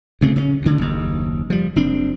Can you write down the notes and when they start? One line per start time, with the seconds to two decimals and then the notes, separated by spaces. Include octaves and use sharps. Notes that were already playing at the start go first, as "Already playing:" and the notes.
0.21 D2 C#3 A3 C4
0.36 C#3 B3 C#4
0.62 D2 D3
0.79 F#1 D#2
1.50 F3 G3
1.76 F#1 C4 D4